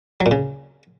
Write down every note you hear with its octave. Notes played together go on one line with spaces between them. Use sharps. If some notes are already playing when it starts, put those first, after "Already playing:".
F#3
A#2
C#3